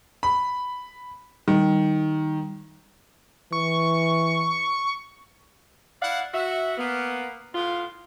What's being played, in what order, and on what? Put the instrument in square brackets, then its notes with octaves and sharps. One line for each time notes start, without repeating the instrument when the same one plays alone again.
[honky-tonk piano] B5
[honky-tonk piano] D#3 [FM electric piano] G3
[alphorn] E3 [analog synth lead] C#6
[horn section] E4 D5 F5 F#5
F#4 E5
A#3 B3
A2 B3 F4